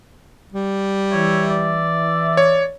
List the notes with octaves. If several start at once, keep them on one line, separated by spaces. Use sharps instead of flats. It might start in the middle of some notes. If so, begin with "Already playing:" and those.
G3
E3 C#5 E5
D5
C#5